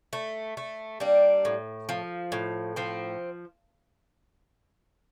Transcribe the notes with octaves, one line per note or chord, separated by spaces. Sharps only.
A3
A3
G3 A#3 D4
A2
F3
A2
F3 C4